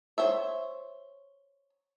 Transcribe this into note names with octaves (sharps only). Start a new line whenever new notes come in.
C5 C#5 E5